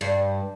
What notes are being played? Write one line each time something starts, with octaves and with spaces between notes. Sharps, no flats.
G2